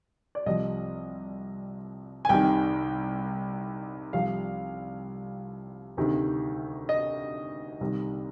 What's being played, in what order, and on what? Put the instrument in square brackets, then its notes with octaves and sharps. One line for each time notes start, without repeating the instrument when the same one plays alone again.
[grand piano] D5
C2 C3 F3 D#5
G#5
C2 C3 D#3 G5
C2 C3 F3 F5
D2 C3 D#3
D#5
C2 C3 D#3